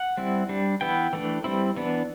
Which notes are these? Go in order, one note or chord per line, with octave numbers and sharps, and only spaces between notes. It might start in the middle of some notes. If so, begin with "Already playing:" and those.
Already playing: F#5
G3 C4 E4
G3 D4
E3 B3 E4 G5
E3 A3 D4
G3 C4 E4
E3 B3 D4